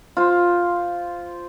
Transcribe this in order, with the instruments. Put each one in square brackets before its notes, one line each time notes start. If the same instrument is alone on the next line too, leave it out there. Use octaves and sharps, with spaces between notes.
[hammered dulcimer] F4 C5